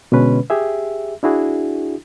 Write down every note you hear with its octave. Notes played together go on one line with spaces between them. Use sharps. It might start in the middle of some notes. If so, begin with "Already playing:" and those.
B2 D3 G#3 C#4 B4
G4 G#4 E5
D4 E4 F#4 G#4